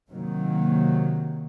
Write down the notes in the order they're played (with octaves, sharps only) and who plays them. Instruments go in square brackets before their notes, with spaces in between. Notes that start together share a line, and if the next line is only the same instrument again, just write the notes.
[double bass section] C3 D#3 F#3 A#3